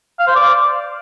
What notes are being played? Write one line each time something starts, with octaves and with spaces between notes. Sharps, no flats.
F5
C5
D5